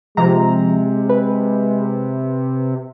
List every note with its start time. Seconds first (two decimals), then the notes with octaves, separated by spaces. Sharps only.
0.17 C3 F3 G#3 A#5
1.09 B4